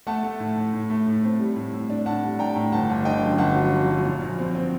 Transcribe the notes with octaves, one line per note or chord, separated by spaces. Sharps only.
A3 F#5 A5
A3
A2
A2
A2
A3
A2
C4
G3
A2
A2
D4
A2 F#5 A5
G3
D4 G5 A#5
A2
G1 F#5 A5
G1
D3 D#5 G5
F#2
G1 F#5 A5
F#3
F#3
F#3
A#2
A#1
C4
C4